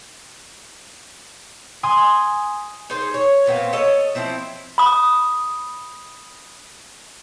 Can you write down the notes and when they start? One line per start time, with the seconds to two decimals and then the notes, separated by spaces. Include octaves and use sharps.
1.83 G#5 C6 D#6
2.90 D#4 G#4 C5
3.14 C#5
3.46 A#2 B3 C4 F5
3.73 A4 C#5 D#5
4.15 F3 C4 E4
4.78 B5 D#6